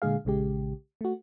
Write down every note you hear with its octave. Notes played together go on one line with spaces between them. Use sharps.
A#2 D3 G#3 G#4 F5
A#1 C#3 G#3 G4
A3 F#4